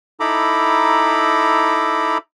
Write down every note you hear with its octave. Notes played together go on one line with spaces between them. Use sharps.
D#4 E4 A4 A#5 B5 D6